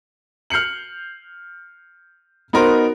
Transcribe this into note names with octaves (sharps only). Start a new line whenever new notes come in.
F6 G6 C7 C#7 F#7
B3 D#4 F#4 A#4 C5